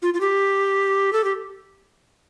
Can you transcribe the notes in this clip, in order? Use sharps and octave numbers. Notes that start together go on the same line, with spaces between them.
F4
F4
G4
A4
G4